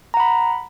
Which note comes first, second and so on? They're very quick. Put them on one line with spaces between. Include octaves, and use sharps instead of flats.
A#5 F#5 B5